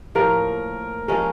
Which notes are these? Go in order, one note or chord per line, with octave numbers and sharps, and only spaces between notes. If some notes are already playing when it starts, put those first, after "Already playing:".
A2 F3 A#3 A#4
F3 G#3 C#4 A#4